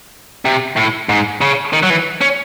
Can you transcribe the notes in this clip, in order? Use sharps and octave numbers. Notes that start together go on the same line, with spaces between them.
C3
A2
G#2
C#3
D#3
F#3
E3
C#4